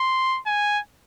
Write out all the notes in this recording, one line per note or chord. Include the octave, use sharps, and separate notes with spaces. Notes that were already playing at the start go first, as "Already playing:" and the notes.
Already playing: C6
G#5